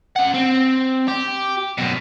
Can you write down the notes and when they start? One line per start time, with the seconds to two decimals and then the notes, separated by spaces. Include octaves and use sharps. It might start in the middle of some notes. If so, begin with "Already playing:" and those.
0.16 C#4 F#5
0.34 C4
1.08 G4
1.78 F#2 B2